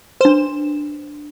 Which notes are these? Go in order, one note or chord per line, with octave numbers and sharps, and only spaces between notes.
D4 B4 C5 E7